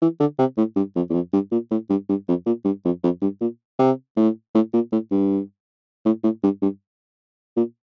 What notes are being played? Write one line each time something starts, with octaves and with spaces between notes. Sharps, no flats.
E3
D3
C3
A2
G2
F2
E2
F2
G2
A#2
A2
G2
G2
F2
A#2
G2
F2
F2
G2
A#2
C3
A2
A2
A#2
A2
G2
A2
A2
G2
G2
A#2